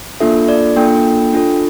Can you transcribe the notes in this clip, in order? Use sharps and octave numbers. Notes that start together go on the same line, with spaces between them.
A#3 D4 F4 A4 E5
D5
A#3 D4 F4 A4 G5
D4 F4 A4